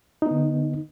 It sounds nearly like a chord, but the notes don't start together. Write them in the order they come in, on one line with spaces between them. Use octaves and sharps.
D#4 B3 D3